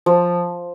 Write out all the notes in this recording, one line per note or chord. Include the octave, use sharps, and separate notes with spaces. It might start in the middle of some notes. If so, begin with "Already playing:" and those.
F3